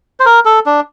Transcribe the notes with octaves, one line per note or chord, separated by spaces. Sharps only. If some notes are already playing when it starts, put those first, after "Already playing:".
C5
A#4
A4
D4